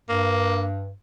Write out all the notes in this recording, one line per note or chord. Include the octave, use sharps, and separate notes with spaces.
G2 A#3